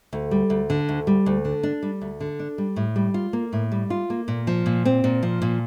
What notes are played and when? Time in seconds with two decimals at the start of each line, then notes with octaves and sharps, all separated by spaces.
0.13 D2
0.31 G3
0.50 D2
0.70 D3
0.89 D2
1.07 G3
1.26 D2
1.45 D3
1.63 D4
1.83 G3
2.01 D2
2.21 D3
2.39 D4
2.58 G3
2.76 A2
2.96 G3
3.14 F4
3.33 A#3
3.53 A2
3.72 G3
3.90 F4
4.10 A#3
4.28 A#2
4.47 F3
4.66 A#2
4.85 C4
5.04 A#2
5.23 F3
5.42 A#2